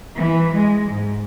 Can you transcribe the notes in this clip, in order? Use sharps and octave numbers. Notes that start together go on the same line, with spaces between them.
E3
G#3
G#2